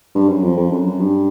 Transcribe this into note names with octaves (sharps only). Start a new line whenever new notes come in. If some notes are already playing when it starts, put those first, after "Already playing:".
G2
F#2
F2
F2
F#2
F#2
G2